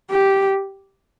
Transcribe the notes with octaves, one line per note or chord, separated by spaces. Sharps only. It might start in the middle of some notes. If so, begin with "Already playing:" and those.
G4